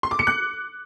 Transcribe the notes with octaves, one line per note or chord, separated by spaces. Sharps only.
C6
D6
C#7
F#6